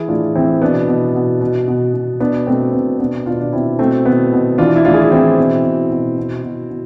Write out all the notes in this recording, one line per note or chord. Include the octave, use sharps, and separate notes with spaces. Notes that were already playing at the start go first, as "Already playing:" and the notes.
Already playing: E3 E4 G#4
A2 D4 F4
E3 C4 E4
B2 B3 D4
B2
B2
B2
B2
B2
B2 B3 D4
B2 A3 C4
B2 B3
B2 B3 D4
B2 D4 F4
D4
B2 C4 E4
B2 A3 C4
B2 B3
B2
E3 D4 F4
E4
A2 D4 F4
G#4
F4
E3 C4 E4
B2
B2
B2
B2
B2
B2